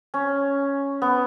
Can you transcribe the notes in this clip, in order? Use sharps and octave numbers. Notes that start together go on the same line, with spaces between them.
C#4
B3